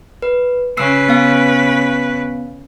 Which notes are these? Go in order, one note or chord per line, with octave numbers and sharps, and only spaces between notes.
B4
C#3 B4 E6 C7
B3 F5